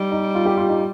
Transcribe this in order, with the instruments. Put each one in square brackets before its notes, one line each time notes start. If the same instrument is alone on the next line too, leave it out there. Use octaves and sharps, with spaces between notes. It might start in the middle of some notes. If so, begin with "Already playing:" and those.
Already playing: [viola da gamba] G3 [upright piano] D#4
[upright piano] D#4
F4
G4
F4
D#4